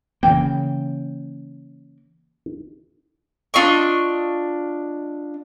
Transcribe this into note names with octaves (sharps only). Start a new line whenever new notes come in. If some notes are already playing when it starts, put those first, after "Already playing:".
C#3 E3 A#3 G5
D4 F4 D#5 C#6